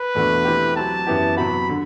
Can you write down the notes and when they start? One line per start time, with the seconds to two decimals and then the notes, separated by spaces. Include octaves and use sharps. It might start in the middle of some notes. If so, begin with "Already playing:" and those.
Already playing: B4
0.15 E2 B2 A3 D4 F#4
0.45 E3 A3 C4 G4
0.76 F#3 C4 G4 A5
1.07 F#2 E3 B3 E4 G4
1.37 C3 F#3 B3 F#4 B5
1.69 D3